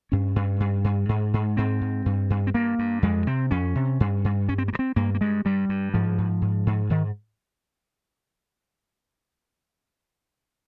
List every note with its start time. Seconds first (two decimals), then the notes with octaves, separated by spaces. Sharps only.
0.12 G2 C#4
0.36 G2
0.60 G2
0.84 G2
1.09 G#2
1.34 G#2
1.57 G#2 C4
1.81 G#2
2.06 G2
2.30 G2
2.47 C4
2.54 G2 A#3
2.79 G2
3.02 F2 G#3
3.27 C3 C4
3.51 F2 C#4
3.75 C3
4.00 G2
4.25 G2
4.49 G2 C#4
4.58 C4
4.68 A#3
4.73 G2
4.79 C4
4.96 G2 A#3
5.14 A#3
5.21 G2 G#3
5.45 G2 G3
5.69 G2
5.94 G#2 F3
6.18 G#2
6.42 G#2
6.67 G#2
6.90 G#2 D#3